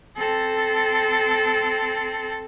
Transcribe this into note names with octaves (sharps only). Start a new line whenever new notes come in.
C4 A4